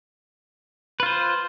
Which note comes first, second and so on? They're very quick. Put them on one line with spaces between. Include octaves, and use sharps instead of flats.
B4 F4 C5